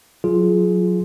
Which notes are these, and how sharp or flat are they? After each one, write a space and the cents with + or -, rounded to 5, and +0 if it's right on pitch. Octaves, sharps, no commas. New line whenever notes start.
F#3 -25 F4 +0 G#4 +20